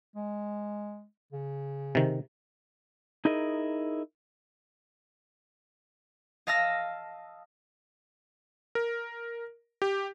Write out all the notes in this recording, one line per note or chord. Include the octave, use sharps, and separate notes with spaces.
G#3
C#3
C3 D#3
D#4 E4 G#4 A#4 D#5
D#5 F5 A5 E6 A#6
A#4
G4